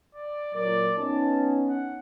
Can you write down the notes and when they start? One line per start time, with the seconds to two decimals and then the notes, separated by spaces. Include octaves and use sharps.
0.14 D5
0.55 A#2 F#3 A#4 D5
0.98 B3 C#4 D#4 A5
1.70 F#5